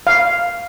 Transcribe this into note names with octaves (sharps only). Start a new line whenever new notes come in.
F5